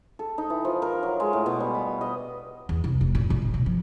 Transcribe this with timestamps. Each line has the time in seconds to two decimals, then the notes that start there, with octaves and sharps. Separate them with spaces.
0.19 A4
0.38 D#4
0.50 E3
0.65 F3
0.82 A#4
1.03 F#3
1.20 G#3
1.33 A2
1.46 B2
1.60 G3
1.75 B5
2.01 D#5
2.69 E2
2.84 C2
3.01 F1
3.15 A#2
3.30 A#1
3.42 F2
3.54 B2
3.66 F3